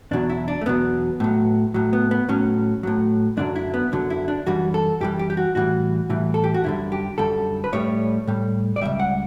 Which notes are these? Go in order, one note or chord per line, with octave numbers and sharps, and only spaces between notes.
E2 B2 F#3 D4
E4
D4
A3
E2 B2 F#3 B3
A2 F#3
A2 F#3
B3
B3
A2 F#3 C#4
A2 F#3
F#2 D3 F#3 D4
E4
B3
F#2 D3 F#3
E4
D4
F#2 E3 G3 F#4
A4
F#2 E3 G3 G4
G4
G4
F#4
A2 E3 G3 F#4
A2 E3 G3
A4
G4
F#4
F#2 D3 G3 E4
G4
F#2 D3 G3 A4
B4
A2 G3 C#5
A2 G3
D5
C#2 C#3 G3 E5
F#5